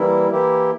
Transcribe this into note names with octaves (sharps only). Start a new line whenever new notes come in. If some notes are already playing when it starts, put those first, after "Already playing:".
Already playing: E3 G3 A#3 E4
E3 A#3 E4 G4